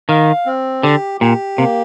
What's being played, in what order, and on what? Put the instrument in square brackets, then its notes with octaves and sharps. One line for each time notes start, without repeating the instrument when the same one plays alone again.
[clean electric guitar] D#3 [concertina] F5
[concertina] C4
[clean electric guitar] D3 [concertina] G4
[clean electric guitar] A#2 [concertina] G4
[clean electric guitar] C3 [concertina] A#3